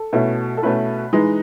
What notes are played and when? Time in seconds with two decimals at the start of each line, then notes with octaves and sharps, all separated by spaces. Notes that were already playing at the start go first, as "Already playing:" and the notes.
Already playing: A4
0.13 B2 A3 C#4 E4
0.57 A4
0.62 B2 A3 C#4 E4 B4
1.13 E3 G#3 D#4